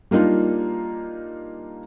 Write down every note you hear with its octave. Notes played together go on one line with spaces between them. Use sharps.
G3 A#3 D4 D#4 F4